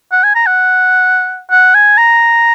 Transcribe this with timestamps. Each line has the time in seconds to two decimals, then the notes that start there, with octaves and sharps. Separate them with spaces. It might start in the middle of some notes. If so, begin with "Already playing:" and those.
0.12 F#5
0.24 G#5
0.35 A#5
0.47 F#5
1.51 F#5
1.74 G#5
1.98 A#5